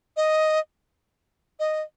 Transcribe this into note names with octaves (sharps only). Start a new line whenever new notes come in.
D#5
D#5